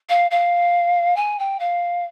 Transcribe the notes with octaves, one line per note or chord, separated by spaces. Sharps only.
F5
F5
G#5
G5
F5